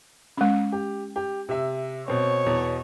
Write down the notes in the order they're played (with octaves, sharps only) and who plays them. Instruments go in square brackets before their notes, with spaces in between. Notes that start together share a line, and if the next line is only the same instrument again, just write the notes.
[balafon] G#3 C#4
[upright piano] G4
G4
C3 E5
[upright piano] B2 C4 [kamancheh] C#5
[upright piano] E2 B2